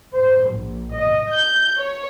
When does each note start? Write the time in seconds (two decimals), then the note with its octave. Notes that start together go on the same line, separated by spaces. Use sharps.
0.14 C5
0.52 A#1
0.93 D#5
1.32 G6
1.78 C#5